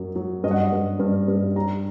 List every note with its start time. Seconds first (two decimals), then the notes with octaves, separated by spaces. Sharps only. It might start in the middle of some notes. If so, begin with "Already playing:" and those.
Already playing: F#2 F#3
0.16 F#3
0.43 G2 D#5
0.51 F#5
0.60 D#5
0.72 G2
0.99 G2
1.28 G2
1.56 G3 A#5